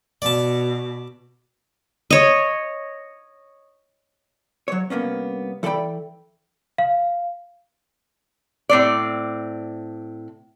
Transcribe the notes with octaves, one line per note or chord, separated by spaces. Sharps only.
B2 D5 A5
C#5 D#5
F#3 C#5
C2 A#3 B3 C#4
E3 A4 D5 F5 G5 B5
F5
A2 C4 D5